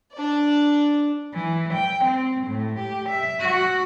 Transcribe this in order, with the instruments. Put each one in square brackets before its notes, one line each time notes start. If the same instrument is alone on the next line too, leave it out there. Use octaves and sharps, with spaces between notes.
[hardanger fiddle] D4 D5
[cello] E3
G5
C4
A2
G4
E5
F#4